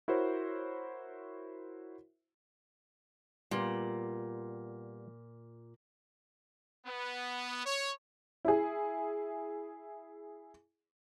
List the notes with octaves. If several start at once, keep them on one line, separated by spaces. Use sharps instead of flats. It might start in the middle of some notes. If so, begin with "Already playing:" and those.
E4 F#4 A#4 C5 C#5 E5
A#2 G3 B3 F4
B3
C#5
E4 G#4